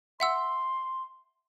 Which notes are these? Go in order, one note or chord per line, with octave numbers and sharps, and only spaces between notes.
E5 F#5 C6 E6